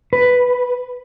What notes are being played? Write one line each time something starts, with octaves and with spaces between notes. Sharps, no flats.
B4